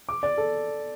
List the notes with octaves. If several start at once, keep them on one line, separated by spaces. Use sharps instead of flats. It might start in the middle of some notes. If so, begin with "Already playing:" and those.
D6
D5
A4